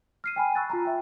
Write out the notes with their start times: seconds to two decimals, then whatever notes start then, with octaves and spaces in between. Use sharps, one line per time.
0.24 F6 C7 D#7
0.36 G5 G#5 B5
0.55 B5 C#6 E6 F#6 A6
0.70 F4 A5 A#5
0.85 E5 G5